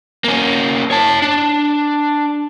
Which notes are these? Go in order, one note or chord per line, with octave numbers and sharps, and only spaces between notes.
A#3 C#4
C#5 A5
D4